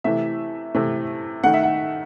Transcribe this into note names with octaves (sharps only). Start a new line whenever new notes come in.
C3 E3 A3 E5
C3 E3 A3
D#3 A3 F#5
E5
F#5